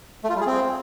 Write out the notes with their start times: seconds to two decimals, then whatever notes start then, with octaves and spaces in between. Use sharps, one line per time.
0.24 A3
0.29 F4
0.35 G3
0.41 G#4
0.46 C4